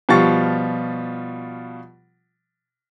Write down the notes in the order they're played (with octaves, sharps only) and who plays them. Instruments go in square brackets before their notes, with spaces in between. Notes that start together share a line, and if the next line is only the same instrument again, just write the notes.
[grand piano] B2 F3 G3 F4 C#6 A6